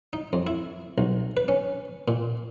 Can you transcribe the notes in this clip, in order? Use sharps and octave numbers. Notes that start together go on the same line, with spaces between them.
D#4
F2
E4
B1
B4
C#4
A#2